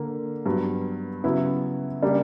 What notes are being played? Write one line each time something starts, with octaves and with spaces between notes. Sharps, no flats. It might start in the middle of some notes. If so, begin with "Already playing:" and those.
Already playing: D3 A#3
G2 F#3 B3
C#3 F#3 B3 E4
C#3 G3 A#3 D4